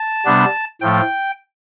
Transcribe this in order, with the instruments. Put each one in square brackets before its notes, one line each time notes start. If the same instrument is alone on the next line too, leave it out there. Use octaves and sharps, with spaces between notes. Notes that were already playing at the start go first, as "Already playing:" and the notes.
Already playing: [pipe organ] A5
C3 G3 B3 D4
A2 F3 A3 G5